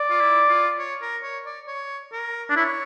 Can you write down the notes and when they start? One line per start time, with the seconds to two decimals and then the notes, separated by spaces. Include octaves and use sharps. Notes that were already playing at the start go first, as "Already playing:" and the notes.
Already playing: D5
0.10 F4
0.20 E4
0.49 F4
0.79 C#5
1.02 A#4
1.23 C#5
1.46 D5
1.67 C#5
2.12 A#4
2.50 D4
2.56 E4 C#5